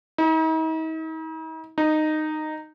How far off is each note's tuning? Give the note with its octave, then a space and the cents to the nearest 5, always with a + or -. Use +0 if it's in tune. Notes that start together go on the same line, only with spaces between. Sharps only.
D#4 +45
D#4 -10